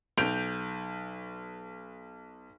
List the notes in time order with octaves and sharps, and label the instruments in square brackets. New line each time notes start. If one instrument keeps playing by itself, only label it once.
[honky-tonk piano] B1 G6 D7 F7